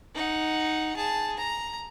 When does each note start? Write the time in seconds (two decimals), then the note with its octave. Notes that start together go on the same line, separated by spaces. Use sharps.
0.15 D#4 F#5
0.97 G#4 A5
1.37 A#5